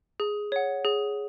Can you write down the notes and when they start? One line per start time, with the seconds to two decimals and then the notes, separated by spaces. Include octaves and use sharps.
0.20 G#4
0.52 C#5 F#5
0.85 G#4